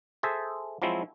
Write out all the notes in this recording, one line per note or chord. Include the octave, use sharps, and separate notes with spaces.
G#4 A4 C5 E5
F3 F#3 G#3 C4 E4